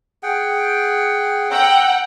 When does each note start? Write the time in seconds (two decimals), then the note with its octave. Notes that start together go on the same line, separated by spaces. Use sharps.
0.23 G#4 F#5 G5
1.51 F#5 G5 A#5 E6